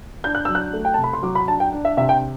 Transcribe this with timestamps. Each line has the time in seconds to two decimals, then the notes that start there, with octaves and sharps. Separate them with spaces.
0.24 D4 G6
0.35 F#6
0.45 F#3 E6
0.55 F#6
0.73 A3
0.85 G5
0.94 C3 A5
1.04 B5
1.13 C6
1.23 F#3 D6
1.35 B5
1.48 D4 A5
1.60 G5
1.72 D4
1.85 E5
1.97 C3 E5
2.09 G5